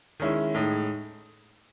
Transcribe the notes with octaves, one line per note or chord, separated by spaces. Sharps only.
D#3 G#3 C#4 E4
A2 G#3 D#4